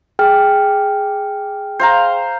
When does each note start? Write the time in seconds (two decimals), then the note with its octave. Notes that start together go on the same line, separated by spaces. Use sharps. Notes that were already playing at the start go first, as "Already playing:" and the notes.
0.19 G#4 G5 F6
1.80 C5 F5 A#5